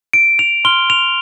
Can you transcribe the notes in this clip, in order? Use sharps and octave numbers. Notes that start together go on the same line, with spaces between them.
D7
F7
C6 F6 G7
F7